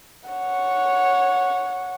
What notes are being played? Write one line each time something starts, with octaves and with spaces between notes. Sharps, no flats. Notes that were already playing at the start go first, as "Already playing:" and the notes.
C#5 F#5